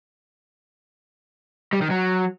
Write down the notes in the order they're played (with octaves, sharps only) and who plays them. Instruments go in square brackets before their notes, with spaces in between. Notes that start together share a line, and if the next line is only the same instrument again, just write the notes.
[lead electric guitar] G3
D#3
F#3